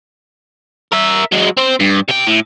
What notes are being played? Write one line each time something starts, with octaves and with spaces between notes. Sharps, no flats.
A#4 E5
F#3 G#3
C4 C5
G2
C3 G5
A2